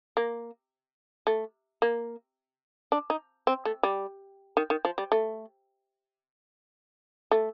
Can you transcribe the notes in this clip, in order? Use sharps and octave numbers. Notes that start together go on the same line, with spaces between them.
A#3
A3
A#3
D4
D#4
C4
A3
G3
D#3
D#3
F3
G3
A3
A3